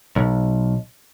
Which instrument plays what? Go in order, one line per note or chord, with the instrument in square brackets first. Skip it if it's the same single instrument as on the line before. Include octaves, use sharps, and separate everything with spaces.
[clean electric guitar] B1